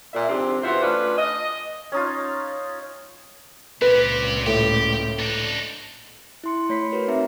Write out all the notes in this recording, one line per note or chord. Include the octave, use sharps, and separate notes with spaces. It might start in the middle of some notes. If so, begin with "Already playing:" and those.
A#2 E5
F2 G#2 C3 C4 D4 G4
B2 E3 F4 C5 E5 F#5
A3 C#4 D4 F4 B4
D#5
C#4 D#4 F4
C#2 A#2 C4 G4 B4
A2 G4
D4 D#4
E4 C6 C#7
A3 C#5 B5 B6 C7
F#4 A#4 B4 C#5
C4 D#4 E5 A#5